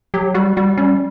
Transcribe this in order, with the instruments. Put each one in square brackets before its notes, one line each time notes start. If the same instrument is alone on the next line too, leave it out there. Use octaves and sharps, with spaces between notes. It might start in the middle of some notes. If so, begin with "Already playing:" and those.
[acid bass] F#3 [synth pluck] G4
[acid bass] G3 [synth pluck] F#4
[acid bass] G3 [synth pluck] F#4
[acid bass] G3 [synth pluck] C#4